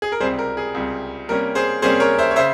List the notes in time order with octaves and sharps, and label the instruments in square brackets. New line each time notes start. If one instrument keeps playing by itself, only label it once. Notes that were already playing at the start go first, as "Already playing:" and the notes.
[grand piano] G#4
A#4
C#2 C3 G3 G#4 C5
A#4
G#4
C#2 C3 G3
C3 G3 A#3 C#4 A#4
G#4 C5
C3 G3 A#3 C#4 G#4 C5
A#4 C#5
C5 E5
C#5
C#3 C5 E5